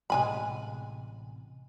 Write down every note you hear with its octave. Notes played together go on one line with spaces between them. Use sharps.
A1 C3 G#3 G#5 B5